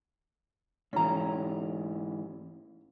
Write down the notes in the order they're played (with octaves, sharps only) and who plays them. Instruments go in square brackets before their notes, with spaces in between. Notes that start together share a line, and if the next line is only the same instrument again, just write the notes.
[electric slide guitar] G#2 E3 [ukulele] C#4 A#5